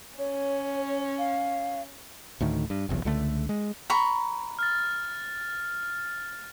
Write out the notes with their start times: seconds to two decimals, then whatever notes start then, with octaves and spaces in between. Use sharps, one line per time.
0.19 C#4 C#5
1.19 F5
2.40 D2 A2 D#3
2.70 G2
2.89 F1 B1 E2
3.05 C#2 D3 A3
3.49 G#3
3.90 A#5 B5 C#6
4.59 F6 A6